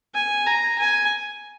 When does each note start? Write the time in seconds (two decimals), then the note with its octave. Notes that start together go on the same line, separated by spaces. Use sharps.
0.15 G#5
0.47 A#5
0.79 G#5